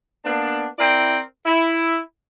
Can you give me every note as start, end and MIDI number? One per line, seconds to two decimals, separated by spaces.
0.25 0.65 58
0.25 0.65 59
0.25 0.65 62
0.79 1.20 60
0.79 1.20 64
0.79 1.20 70
0.79 1.20 74
0.79 1.20 79
1.45 1.99 64